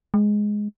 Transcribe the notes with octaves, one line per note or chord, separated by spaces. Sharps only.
G#3